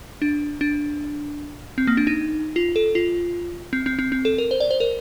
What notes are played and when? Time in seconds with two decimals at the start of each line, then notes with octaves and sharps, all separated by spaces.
0.22 D4
0.61 D4
1.78 C4
1.87 A#3
1.97 D4
2.07 D#4
2.56 F4
2.76 A4
2.95 F4
3.73 C4
3.86 C4
3.99 C4
4.12 C4
4.25 A4
4.38 A#4
4.51 C5
4.60 D5
4.71 C5
4.80 A#4